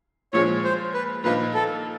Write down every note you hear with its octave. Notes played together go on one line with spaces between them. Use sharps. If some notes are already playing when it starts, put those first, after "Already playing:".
A#2 F3 G#3 C#5
C5
B4
A#2 F3 A#3 D#4 B4
A4